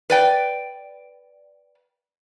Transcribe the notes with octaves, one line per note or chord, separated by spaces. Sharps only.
B4 D5 G5